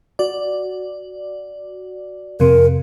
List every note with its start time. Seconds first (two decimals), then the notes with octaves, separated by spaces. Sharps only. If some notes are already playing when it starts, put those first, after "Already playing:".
0.19 F#4 D5
2.40 F2 C3 A#4